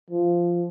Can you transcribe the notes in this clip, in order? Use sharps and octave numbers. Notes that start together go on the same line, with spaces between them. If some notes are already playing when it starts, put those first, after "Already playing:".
F3